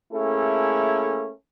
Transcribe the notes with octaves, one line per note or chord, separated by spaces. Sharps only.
A3 A#3 C#4 E4 G#4 A4